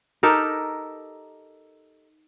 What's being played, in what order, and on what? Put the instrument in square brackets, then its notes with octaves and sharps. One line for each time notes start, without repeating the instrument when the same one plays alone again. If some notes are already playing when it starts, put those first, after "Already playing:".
[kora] D#4 G4 A4 A#4